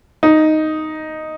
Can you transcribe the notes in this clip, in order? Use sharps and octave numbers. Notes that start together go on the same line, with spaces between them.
D#4